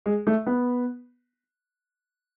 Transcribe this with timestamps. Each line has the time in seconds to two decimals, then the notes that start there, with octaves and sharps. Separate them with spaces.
0.06 G#3
0.27 A3
0.47 B3